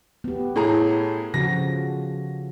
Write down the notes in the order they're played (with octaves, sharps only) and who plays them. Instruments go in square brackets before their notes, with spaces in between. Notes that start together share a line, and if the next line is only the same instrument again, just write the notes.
[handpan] B3 G4
[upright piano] A2 G#4 A#5 [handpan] A4
[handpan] C#3 F3 F#4 [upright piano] A#6